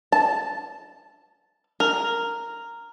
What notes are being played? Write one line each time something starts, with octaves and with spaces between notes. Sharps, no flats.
A5
A#4